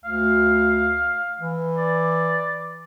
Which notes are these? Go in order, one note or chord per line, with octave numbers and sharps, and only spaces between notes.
D2 F5
E3
D5